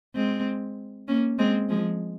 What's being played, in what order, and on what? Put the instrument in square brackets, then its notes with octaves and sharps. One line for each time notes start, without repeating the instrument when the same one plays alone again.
[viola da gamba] G#3 C4
A#3 C#4
G#3 C4
F3 G#3